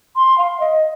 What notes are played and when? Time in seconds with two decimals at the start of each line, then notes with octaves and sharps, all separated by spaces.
0.16 C6
0.38 F5
0.60 D#5